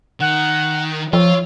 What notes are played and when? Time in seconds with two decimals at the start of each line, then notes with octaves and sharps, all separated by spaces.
0.21 D#3 F#5
1.13 F3 F4 C#5 E6